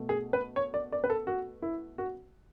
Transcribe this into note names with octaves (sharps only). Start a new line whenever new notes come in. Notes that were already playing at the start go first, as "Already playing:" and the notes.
Already playing: B2 A3
G#4
B4
C#5
D5
D5
B4
A4
F#4
E4
F#4